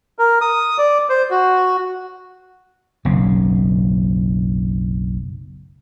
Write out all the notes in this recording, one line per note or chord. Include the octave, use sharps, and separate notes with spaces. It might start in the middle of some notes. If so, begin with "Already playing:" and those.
A#4
D#6
D5
C5
F#4
F#1 B1 C#3